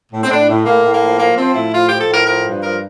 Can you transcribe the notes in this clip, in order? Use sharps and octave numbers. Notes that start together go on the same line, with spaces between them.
A2
C4
A2 D4
A2
A2 A#3
A2
A#3
F3
F3 A#3
F3 C4
A2 E4
F3 F4
F3 G4
A4
A2 A#4
F3 A#4
G2
F3 A#4